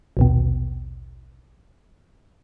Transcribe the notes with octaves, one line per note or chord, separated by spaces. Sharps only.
A#1 D#2 B2